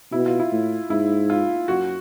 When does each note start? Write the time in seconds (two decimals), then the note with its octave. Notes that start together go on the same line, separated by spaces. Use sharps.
0.12 B2 E4
0.26 F4
0.40 E4
0.51 A2
0.90 G#2 E4
1.30 F4
1.68 F#2 F#4